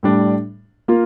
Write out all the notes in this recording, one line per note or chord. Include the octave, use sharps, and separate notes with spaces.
A2 G3 D4
A#3 F4